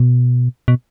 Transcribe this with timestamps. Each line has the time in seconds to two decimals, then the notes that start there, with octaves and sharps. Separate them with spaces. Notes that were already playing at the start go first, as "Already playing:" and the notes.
Already playing: B2
0.68 B2